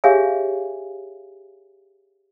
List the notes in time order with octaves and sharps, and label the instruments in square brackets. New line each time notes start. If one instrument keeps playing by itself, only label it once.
[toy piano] G4 G#4 C#5 E5 F5 G#5